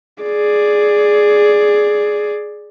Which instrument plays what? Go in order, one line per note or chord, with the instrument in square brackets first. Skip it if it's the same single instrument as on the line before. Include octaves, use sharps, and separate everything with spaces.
[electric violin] G#4 D5